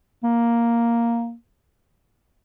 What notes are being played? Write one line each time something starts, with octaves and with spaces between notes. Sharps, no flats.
A#3